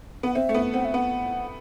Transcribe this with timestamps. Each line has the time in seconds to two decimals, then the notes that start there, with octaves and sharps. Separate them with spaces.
0.23 B3 F#5
0.34 C4 E5
0.49 A3
0.54 B3
0.74 C4 F#5
0.85 E5
0.94 B3 F#5